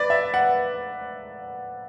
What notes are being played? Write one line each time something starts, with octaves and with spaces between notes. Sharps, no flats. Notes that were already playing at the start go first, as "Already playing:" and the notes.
Already playing: B4 D5
E5
F#5